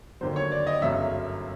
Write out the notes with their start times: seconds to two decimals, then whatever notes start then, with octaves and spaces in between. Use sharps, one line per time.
0.21 D#2 D3 F#3 C5
0.36 C#5
0.52 D5
0.67 D#5
0.82 G1 F#2 C#3 F#3 E5